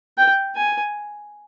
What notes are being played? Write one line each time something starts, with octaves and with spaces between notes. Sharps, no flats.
G5
G#5